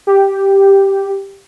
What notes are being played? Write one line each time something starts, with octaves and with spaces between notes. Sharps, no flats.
G4